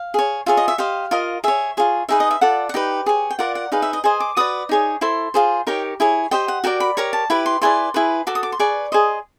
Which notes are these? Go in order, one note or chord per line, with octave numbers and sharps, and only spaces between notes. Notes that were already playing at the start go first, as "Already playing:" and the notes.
Already playing: F5
G#4 C#5
F4 G#4 C#5 E5
D#5
E5
G4 C5 D#5 F5
F4 A#4 D#5
G#4 C#5 E5
F4 G#4 C#5
D#4 G#4 B4 E5
D#5
E5
F4 A4 D5 F#5
F#5
D#4 G4 B4 G5
G#4 C#5
G5
F4 A#4 D5 F#5
F#5
D#4 G#4 B4 F5
E5
D#5
G#4 C5 D#5 G#5
D6
F#4 B4 D5 D#6
D#4 G#4 C#5
E4 A4 C5 C6
F4 G#4 C5
D#4 G4 A#4 C#5 G5
E4 G#4 C#5
G4 C5 D#5 G5
F#5
F#4 A#4 D5 G5
B5
G4 A#4 C#5 A#5
A5
E4 G4 B4 B5
C6
E4 G#4 B4 D5 C6
E4 G#4 B4
F#4 A4 D6
D#6
D6
C6
G#4 B4 D5 C#6
G#4 C5 D#5